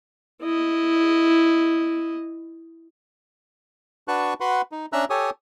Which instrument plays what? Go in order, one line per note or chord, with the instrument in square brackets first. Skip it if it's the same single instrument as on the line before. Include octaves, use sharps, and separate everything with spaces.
[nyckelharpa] E4 D#5
[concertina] D4 F#4 B4 A5 C#6 F#6
F#4 B4 F#5 B5 C6
D#4
C#4 D4 E5 A#5 E6 F#6
G4 A4 C#5 G#5 D#6